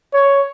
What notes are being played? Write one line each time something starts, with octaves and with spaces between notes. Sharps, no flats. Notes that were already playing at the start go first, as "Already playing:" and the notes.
C#5